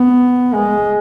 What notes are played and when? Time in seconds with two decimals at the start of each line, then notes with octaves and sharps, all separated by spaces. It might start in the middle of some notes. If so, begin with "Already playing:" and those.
Already playing: B3
0.54 G#3